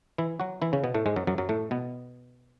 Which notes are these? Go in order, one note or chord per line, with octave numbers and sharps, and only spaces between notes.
E3 E4
F#3 F#4
E3 E4
C#3 C#4
B2 B3
A2 A3
G#2 G#3
F#2 F#3
F#2 F#3
F#2 F#3
A2 A3
B2 B3